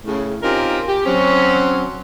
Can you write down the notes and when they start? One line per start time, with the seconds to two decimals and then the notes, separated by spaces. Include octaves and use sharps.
0.05 A2 C#3
0.43 C4 C#4 D#4 F4 G4 A#4
0.87 G4
1.05 F#3 C4 C#4